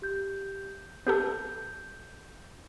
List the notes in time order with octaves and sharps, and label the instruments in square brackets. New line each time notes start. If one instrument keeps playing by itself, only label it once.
[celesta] G4 G6
[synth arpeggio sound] B3 G4 A4 [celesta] G6